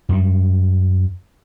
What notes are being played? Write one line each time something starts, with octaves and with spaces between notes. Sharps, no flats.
F#2 G3